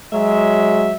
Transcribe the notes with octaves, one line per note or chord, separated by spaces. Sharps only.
F#3 G#3 E5